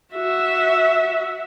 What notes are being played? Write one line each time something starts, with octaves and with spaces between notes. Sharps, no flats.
F#4 E5